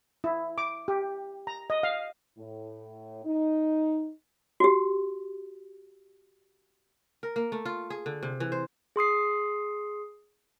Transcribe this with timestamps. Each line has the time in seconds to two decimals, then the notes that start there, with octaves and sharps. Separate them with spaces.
0.24 E4
0.58 D6
0.88 G4
1.47 A#5
1.70 D#5
1.83 F5
2.37 A2
3.24 D#4
4.60 F#4 G4
7.23 A#4
7.36 A#3
7.52 A3
7.65 F4
7.90 G#4
8.06 D3
8.23 C3
8.40 E3
8.52 C5
8.96 G#4 C6 D#6 C7